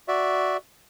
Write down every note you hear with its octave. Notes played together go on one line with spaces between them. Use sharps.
F#4 D5 E5